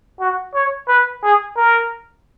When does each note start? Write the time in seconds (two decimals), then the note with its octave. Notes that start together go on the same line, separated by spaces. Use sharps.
0.20 F#4
0.54 C#5
0.88 B4
1.23 G#4
1.56 A#4